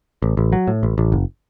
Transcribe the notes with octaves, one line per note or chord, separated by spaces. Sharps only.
A1
A1
F#3
A2
A1
A1
F#1